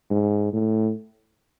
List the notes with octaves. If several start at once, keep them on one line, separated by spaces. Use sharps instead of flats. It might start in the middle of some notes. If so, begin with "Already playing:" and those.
G#2
A2